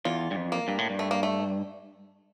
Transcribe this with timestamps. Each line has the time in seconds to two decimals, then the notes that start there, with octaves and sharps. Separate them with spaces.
0.05 E2 F4
0.31 G2
0.36 F2
0.52 A#3
0.68 G2
0.78 A2
0.90 G2
0.99 A3
1.11 A#3
1.23 A3